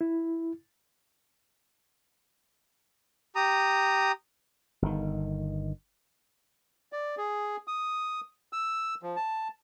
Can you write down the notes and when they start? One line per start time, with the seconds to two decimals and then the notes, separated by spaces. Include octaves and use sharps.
0.01 E4
3.36 G4 A#5 D#6
4.82 G1 D#3
6.92 D5
7.18 G#4
7.67 D#6
8.53 E6
9.03 F3
9.16 A5